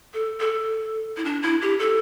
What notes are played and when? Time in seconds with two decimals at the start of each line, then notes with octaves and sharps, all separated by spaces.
0.14 A4
0.40 A4
1.17 E4
1.25 D4
1.43 E4
1.62 G4
1.79 A4